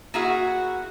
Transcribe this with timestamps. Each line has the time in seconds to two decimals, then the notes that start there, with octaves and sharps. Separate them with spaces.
0.14 A#3 E4 F#4 G#4